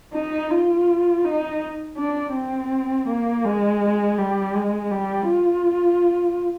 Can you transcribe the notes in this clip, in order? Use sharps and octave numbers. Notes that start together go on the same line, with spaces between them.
D#4
F4
D#4
D4
C4
A#3
G#3
G3
G#3
G3
F4